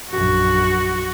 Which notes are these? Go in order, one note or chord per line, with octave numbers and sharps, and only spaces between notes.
A#1 F#2 F#4